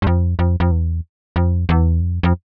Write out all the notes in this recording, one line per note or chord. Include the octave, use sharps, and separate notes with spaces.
G2
F2
F2
F2
E2
F2
E2
F2
F2